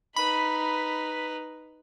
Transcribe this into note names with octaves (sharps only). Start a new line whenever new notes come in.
D#4 B4 B5